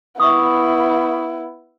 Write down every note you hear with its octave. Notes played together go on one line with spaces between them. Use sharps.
B3 E4 E5 C#6 D#6